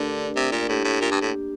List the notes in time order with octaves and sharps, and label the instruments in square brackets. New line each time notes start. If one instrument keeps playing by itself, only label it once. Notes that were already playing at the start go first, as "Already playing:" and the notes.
Already playing: [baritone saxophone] D3 [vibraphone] A3 D4 G4 A#4 D5
[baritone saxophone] C3
A#2
[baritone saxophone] A2 [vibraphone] A#3 D4 G4
[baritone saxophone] A2
A#2
G2
A2